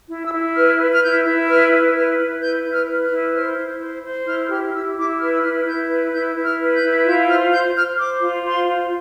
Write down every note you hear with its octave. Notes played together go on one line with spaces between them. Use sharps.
E4
E6
E4
B4 F6
B4
F6
E4 G6
E4
B4 F6
E4
B4 F6
E4
B4 G6
E4
F6
B4
F6
E4
C5 F6
E4
C5
C5
E4 F6
G4 F6
E4 E6
E4 D6
B4 F6
E6
E4 F6
E4 G6
B4
E4 G6
E4
F6
B4
G6
E4
F4 G6
C5 F6
C5 G6
C5 F6
C5 D6
F4
C5 C6
F4